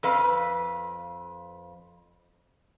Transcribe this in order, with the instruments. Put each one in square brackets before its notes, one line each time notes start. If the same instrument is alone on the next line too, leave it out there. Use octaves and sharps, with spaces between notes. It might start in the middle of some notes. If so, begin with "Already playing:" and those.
[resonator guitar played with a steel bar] F2 B4 F5